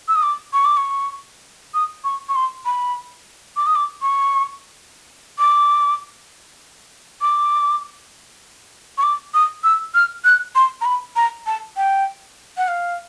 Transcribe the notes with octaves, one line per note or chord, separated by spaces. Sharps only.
E6
D#6
D6
C#6
D6
C#6
D#6
C#6
C#6
C6
B5
D6
D#6
D6
C#6
D6
D6
C#6
D6
D#6
E6
F6
F#6
C6
A#5
B5
A#5
A5
G5
F#5
F5